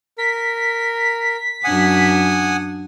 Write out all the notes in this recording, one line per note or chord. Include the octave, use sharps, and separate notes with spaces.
A#4 B6
F#2 D4 F#5 G#5 D#6